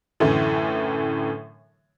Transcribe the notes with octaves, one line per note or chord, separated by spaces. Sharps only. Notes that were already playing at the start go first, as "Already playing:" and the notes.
F#2 A2 D3 E3